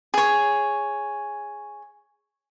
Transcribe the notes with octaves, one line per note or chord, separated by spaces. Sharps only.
G#4 C#5